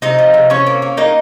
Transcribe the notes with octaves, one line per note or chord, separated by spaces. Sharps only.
C3 D#4 D#5
F3
C3
C3 C#4 C#5
A#3
A#3
A#3 D#4 D#5